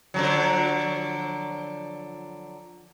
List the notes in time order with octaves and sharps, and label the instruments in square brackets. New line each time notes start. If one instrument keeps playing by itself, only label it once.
[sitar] D3 F3 F#3